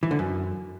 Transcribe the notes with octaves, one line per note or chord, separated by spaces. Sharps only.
E3
D3
F#2